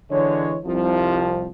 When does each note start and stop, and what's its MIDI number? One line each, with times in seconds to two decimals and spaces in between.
0.11 0.56 50
0.11 0.56 52
0.11 0.56 56
0.11 0.56 73
0.65 1.46 36
0.65 1.46 41
0.65 1.46 53